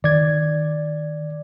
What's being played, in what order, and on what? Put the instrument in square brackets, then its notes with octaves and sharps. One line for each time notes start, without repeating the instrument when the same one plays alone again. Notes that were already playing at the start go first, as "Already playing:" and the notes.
[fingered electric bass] D#3 [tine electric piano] D5 G#6